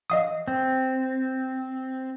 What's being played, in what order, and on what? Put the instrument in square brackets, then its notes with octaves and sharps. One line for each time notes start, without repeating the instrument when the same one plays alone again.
[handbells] D#5 F5 D#6
[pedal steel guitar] C4